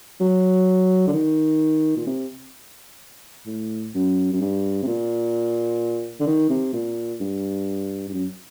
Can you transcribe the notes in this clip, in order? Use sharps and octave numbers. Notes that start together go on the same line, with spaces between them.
F#3
D3
D#3
A#2
C3
A2
F#2
F#2
G2
C3
A#2
D3
D#3
C3
A#2
G2
G2
F#2